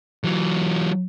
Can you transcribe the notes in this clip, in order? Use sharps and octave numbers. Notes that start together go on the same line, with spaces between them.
E3 F#3